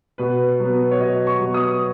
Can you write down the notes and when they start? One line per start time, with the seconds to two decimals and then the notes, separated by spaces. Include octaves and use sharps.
0.18 B2 B4
0.60 F#3 B3
0.91 C#5
1.00 B2 D#5
1.27 C#6
1.41 F#3 B3
1.54 D#6